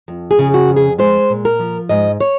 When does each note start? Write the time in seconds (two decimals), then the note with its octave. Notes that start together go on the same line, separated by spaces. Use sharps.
0.08 F2
0.31 G#4
0.39 C#3
0.54 F#4
0.69 F2
0.77 G#4
0.98 G#3 C5
1.30 A#2
1.45 A#4
1.59 F3
1.89 G#2 D#5
2.21 C#5